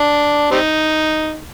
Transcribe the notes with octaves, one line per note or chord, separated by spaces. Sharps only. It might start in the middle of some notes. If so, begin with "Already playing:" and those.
Already playing: D4
G3 C4 D#4